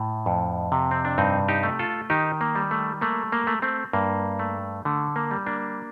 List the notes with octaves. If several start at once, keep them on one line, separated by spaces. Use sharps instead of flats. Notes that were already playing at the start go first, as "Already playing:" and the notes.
Already playing: A2
F2
C3
C4
D4
G2 C4 D#4
D#4 G4
A3
F4 A4
D#3 D#4 G4
A#3
G3
A3
A3 A#3
A#3
A3
A3 C4
G2 A#3
A3
D3 A3
A#3
G3
A#3 D4